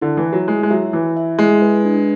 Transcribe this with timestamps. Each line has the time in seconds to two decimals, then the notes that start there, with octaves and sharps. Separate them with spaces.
0.02 D3 E4
0.17 E3
0.25 E5
0.33 F#3
0.48 G#3 E4
0.63 G#3
0.70 F#3 E5
0.93 E3 E4
1.17 E5
1.39 G#3 E4
1.62 B4
1.85 D4